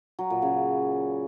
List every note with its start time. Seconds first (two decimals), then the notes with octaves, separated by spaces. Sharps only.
0.19 F#3
0.30 A#2
0.42 C#3